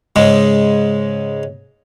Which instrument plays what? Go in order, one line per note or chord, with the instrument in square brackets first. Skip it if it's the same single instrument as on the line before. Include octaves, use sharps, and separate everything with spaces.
[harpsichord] G#2 C#3 G#3